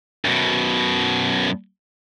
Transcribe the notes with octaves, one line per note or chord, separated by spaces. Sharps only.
F#2 B2